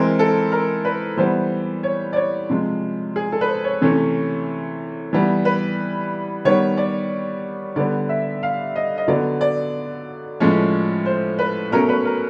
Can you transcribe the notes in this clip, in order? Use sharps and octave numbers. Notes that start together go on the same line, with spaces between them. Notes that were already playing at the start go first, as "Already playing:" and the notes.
Already playing: E3 G#3 C4 A#4
A4
A#4
B4
E3 G3 B3 C5
C#5
D5
C#5
C3 F3 G#3
G#4
A4
B4
C5
C#5
C3 E3 A3 C#4
E3 G3 B3
B4
D#3 G3 B3 C#5
D5
D3 G3 B3 D5
E5
F5
D#5
D#5
D3 F#3 B3 D5
D5
A2 F3 G#3 C#4
C5
B4
B2 F#3 A3 C#4 A#4
B4
A#4